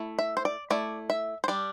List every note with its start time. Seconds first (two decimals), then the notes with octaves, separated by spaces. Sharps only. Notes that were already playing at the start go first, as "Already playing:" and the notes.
Already playing: A3 E4
0.19 E5
0.37 C5
0.45 D5
0.70 A3 E4 D5
1.10 E5
1.44 C5
1.48 G3 D4 D5